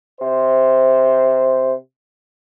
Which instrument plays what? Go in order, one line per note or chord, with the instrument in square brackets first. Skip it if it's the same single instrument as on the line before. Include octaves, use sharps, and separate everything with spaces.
[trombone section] C3 C5